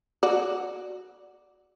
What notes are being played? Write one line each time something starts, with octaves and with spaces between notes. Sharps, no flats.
F#4 D5